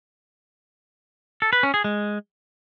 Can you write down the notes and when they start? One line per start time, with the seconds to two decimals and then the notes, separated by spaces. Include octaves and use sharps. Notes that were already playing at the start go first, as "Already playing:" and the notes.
1.42 A4
1.53 B4
1.63 C#4
1.74 G#4
1.84 G#3